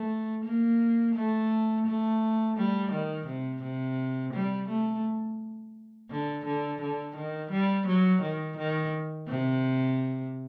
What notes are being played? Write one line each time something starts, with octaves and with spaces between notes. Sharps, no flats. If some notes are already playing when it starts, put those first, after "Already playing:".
Already playing: A3
A#3
A3
A3
G3
D#3
C3
C3
G3
A3
D3
D3
D3
D#3
G3
F#3
D#3
D#3
C3